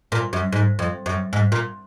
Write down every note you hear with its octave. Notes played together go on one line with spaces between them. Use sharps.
A#2
F#2
G#2
F2
F#2
G#2
A#2